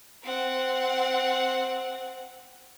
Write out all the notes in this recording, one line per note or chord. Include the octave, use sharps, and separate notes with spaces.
C4 F#5